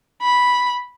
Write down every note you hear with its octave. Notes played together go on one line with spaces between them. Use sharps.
B5